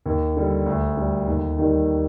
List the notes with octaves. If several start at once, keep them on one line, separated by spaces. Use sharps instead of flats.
D#2
D3 G3
D2
D3 G3
D#2
D#3 G3